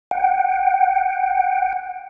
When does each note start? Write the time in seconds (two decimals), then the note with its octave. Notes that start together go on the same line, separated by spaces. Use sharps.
0.11 F#5 G5